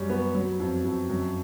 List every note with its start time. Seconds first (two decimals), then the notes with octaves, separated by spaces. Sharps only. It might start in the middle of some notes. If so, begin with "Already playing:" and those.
Already playing: F#2 G3 C#4
0.10 B3
0.35 F#3
0.60 F2
0.85 F2
1.09 F#2